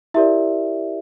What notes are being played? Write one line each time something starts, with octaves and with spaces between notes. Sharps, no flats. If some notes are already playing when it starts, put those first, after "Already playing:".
E4 G4 A#4 D5 E5